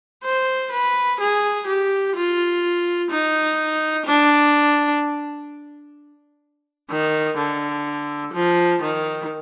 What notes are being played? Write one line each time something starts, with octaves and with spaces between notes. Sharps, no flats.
C5
B4
G#4
G4
F4
D#4
D4
D#3
D3
F3
D#3